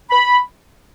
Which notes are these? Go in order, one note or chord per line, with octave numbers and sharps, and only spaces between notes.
B5